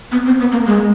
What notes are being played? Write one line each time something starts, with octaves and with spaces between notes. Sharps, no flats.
B3
C4
B3
A#3
G#3